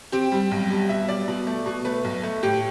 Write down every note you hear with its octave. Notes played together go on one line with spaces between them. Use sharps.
C4 G4
G3
B1
G3
B2 E5
G3 D5
B2
A3
B2
A3 B4
B1
A3
A2 G4